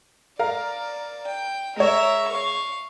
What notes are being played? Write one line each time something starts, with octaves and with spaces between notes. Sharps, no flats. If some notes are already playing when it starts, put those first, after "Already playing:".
A#4 D5 F5 A#5
G5
G#3 A#4 C#5 E5
F5 C#6